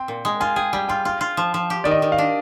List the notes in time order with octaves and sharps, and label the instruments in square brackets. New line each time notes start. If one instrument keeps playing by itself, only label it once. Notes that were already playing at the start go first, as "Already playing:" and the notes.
Already playing: [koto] C4 [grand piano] G5
[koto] A#2
G#3
[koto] F4 [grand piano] G#5
[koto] G#4 [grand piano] G5
[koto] G3 [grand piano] G5
[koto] F4 [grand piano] G5
[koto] F4
F4
F3
F3
G4
[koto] D#3 [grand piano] D5
[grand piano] D#5
[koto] D#3
[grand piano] F5
[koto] D4